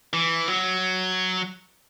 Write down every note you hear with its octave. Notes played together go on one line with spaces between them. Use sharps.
E3
F#3